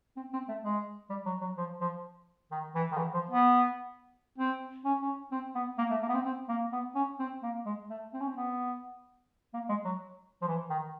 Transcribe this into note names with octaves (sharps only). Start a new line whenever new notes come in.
C4
C4
A3
G#3
G3
F#3
F#3
F3
F3
D#3
E3
D#3
E3
F3
B3
C4
C#4
C#4
C4
B3
A#3
A3
A#3
B3
C4
C4
A#3
B3
C#4
C4
A#3
G#3
A3
C4
C#4
C4
B3
A#3
G#3
F#3
F3
E3
D#3